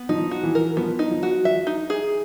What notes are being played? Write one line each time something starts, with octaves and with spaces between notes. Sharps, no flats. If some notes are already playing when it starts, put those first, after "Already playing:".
Already playing: B3
F3 D#4
F#4
E3
A#4
F3 B3
D#4
F3
F#4
F3 E5
D#4
G#4